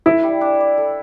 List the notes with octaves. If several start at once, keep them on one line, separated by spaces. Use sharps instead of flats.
E4 A4
G3
D4
D5
A4